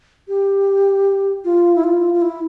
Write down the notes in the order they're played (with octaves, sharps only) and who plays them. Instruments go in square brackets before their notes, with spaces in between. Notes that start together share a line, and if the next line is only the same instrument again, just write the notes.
[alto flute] G4
F4
E4
F4
F4
E4